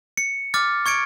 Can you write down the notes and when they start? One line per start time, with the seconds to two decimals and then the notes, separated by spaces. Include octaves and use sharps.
0.17 C#7
0.54 D6 F6 A6
0.86 C#6 G#6 C#7 D7